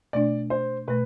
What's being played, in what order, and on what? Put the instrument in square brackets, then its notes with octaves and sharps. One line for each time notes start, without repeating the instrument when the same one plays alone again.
[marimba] B2 A3 D4 [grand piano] D5
[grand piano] C5
[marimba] B2 A3 [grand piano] B4